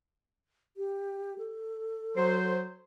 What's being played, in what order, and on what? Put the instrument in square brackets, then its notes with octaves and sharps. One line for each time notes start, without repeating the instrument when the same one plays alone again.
[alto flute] G4
A4
[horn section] F#3 C5